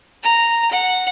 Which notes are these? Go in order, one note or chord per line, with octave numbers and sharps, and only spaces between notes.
A#5
F#5